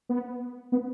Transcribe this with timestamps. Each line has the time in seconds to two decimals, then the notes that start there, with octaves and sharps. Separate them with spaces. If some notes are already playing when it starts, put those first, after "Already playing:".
0.09 B3
0.72 B3